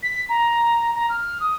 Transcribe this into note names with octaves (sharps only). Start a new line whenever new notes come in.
B6
A#5
A#5
F6
D#6